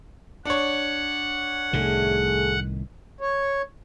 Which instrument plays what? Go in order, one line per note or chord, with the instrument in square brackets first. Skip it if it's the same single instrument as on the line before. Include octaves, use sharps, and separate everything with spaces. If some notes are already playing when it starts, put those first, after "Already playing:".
[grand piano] D4 C#5 [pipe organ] F#5
[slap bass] C2 A2 D#3 [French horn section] A3 G#4
[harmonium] C#5